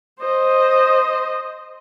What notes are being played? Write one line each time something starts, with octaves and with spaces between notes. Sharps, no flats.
C5 D#5